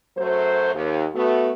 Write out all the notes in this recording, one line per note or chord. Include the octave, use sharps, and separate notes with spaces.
F#2 F#3 A3 C5
D#2
A3 B3 F#4